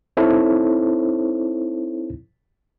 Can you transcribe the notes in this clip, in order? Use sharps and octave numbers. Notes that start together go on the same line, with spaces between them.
C4 D#4 E4 A4 C5 C#5